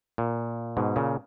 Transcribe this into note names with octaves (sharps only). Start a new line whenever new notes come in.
A#2
G#2 B2
A#2 C#3